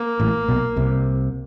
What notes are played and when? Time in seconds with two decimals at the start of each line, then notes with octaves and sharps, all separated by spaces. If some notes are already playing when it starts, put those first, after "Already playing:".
Already playing: A#3
0.20 A1 A2
0.48 B1 B2
0.76 C2 C3